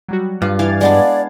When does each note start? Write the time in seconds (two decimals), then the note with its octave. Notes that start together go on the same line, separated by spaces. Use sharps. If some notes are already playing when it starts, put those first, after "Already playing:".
0.09 F#3 G3 F#4
0.42 G2 F4
0.59 E3 F5 G#6 A6
0.81 G#3 B3 D4 D5